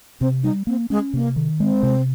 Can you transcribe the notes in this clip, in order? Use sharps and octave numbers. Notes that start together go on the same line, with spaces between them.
C3 C4
G3 D#4
A#3 C4
G#3 C#4
C3 A#3
D#3
G#3 C4
C3